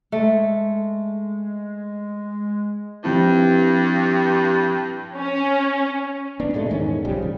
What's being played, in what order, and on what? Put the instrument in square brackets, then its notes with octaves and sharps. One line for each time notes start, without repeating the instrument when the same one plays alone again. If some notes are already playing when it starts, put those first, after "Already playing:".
[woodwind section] G#3 [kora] A3
[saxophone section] G2 [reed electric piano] F3 C4 E4
[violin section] C#4
[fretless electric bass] B3 D4
D2 A#2 G#3 A3
E2 G#2 D#3 C#4
B1 C#3 F3 G3
A1